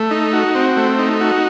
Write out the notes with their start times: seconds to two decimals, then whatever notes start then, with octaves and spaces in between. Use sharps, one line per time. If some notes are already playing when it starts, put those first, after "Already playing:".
Already playing: A3
0.11 D#4
0.33 F#4
0.55 C4
0.77 A3
0.98 D#4
1.21 F#4